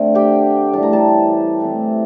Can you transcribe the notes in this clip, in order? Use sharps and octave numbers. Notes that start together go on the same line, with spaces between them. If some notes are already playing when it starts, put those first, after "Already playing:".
Already playing: D3 A3 C4
G4 G5
A2 E3 G3 A5
A#5
A4 A5
E3 A3 C4